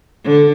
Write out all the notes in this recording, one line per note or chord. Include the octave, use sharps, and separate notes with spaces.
D3